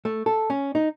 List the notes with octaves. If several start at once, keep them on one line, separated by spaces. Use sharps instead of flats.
A3
A4
C#4
D#4